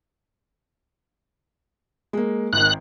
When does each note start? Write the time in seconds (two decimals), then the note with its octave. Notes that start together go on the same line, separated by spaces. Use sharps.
2.13 G#3 A#3
2.53 G#1 D#3 F#6